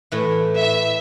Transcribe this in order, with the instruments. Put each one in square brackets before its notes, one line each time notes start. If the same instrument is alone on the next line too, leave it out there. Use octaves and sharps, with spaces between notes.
[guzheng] A2 E3
[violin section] E5